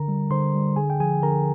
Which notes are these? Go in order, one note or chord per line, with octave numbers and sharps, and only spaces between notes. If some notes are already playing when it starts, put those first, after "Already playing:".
Already playing: D3 A#4 A#5
G3
D3 C5 C6
G3
D3 G#4 G#5
G5
F3 G#4 G#5
D3 A#4 A#5